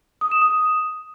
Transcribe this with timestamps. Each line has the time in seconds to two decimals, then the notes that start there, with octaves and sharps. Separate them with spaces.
0.21 D#6
0.31 E7
0.42 D#6